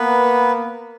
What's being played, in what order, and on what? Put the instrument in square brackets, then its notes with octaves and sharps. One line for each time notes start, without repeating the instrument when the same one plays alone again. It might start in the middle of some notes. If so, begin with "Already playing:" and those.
Already playing: [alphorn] A#3 [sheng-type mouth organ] B3 B4